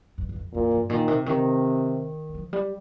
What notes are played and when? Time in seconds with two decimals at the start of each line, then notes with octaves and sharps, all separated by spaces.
0.18 G2
0.29 G2
0.36 F2
0.53 F2 A#2
0.71 G2
0.90 A#2 D#3
1.08 C3
1.26 C3 D#3
2.29 G3
2.35 F3
2.53 G3